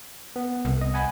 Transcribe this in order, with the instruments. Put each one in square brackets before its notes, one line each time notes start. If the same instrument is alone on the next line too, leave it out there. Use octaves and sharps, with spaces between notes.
[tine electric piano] B3
[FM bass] C2
[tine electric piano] D#5
F#5 G#5 B5